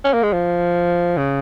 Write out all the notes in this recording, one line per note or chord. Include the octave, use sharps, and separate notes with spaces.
C#4
A#3
G#3
F3
C#3